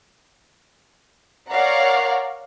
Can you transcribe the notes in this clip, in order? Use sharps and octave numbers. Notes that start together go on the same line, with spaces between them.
A#4 C#5 D5 F5 F#5 A#5